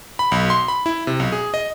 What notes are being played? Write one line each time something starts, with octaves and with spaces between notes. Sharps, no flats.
B5
B1
C6
B5
E4
C3
B1
G#4
D#5